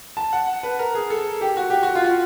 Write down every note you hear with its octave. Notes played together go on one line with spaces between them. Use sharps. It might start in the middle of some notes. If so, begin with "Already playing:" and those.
A5
F#5
B4
A#4
G#4
A4
G4
F#4
G4
F#4
F4
F#4